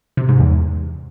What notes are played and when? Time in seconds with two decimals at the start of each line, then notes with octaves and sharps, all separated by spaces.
0.17 C3
0.29 G#2
0.40 E2